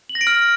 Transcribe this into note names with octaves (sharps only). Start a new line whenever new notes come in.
F#7
A#6
D7
F6